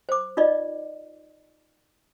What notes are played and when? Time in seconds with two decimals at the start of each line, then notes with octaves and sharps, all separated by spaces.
0.09 C5 D6
0.37 D#4 F4 D5 D#5